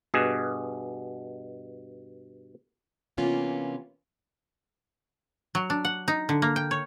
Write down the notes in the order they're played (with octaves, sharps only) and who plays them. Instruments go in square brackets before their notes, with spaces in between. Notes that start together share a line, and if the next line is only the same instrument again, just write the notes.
[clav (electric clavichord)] G2 B2 G#4
[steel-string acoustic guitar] C3 E3 A#3 B3 C#4 F4
[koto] F#3
D4
F#5
D#4
D3
A#3
G5
C#5